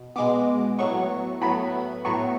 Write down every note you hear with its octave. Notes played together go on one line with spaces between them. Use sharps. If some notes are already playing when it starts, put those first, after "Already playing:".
Already playing: B2
B2 G#3 B3 D6
A2 F#3 B3 C#6
A2 F#3 B3 B5
A2 F#3 B3 C#6